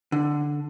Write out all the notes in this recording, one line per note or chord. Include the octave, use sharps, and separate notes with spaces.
D3